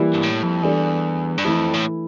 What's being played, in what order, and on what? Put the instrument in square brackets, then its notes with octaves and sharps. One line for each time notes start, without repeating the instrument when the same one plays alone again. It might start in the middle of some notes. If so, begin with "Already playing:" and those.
Already playing: [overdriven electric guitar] E3 [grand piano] G3 A#3 E4 G4
[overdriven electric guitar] G2
A2
F2
[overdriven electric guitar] E2 [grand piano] G3 D4 A4
[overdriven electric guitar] G2
[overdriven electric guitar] F2 [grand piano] E3 A3 E4
[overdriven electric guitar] A2